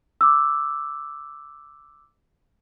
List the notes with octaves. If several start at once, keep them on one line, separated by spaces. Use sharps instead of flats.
D6 E6